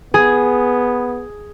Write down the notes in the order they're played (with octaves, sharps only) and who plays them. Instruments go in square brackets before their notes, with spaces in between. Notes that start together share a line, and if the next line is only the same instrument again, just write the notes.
[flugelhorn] B3 [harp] G#4